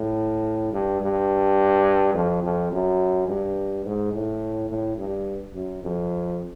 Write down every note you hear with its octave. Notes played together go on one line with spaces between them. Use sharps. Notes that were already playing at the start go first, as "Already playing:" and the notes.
Already playing: A2
G2
G2
F2
F2
F#2
G2
G#2
A2
A2
G2
F#2
F2